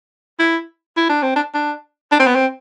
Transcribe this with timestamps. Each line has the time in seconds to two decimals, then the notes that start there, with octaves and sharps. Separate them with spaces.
0.39 E4
0.97 E4
1.09 D4
1.23 C4
1.35 D4
1.54 D4
2.11 D4
2.19 C4
2.27 B3
2.35 C4